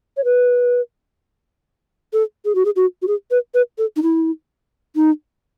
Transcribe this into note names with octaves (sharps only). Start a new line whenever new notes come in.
C#5
B4
A4
G#4
F#4
G#4
F#4
F#4
G#4
B4
B4
A4
D#4
E4
D#4